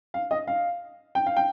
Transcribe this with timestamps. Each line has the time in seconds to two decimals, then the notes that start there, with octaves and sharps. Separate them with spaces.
0.14 F5
0.31 D#5
0.47 F5
1.15 G5
1.26 F5
1.37 G5